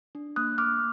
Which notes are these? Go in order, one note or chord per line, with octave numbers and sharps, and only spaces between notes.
D4
A#3 D#6 F#6
A#3 D6 F6